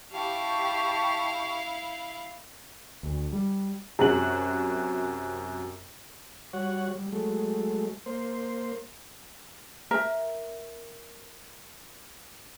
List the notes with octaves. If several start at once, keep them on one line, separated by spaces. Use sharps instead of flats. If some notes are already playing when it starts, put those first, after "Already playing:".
E4 G4 F5 A5 C#6
D2
G3
F#2 C3 F#4 F#7
G3 F#4 C#5 F#5
G3
F#3 G#3 A3
A#3 C5
A#4 E5 A#5